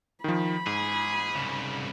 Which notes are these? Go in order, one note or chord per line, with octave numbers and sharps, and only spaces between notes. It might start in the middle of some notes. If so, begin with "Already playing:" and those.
D#3 F3 B5
G#2 G#4
C2 C#3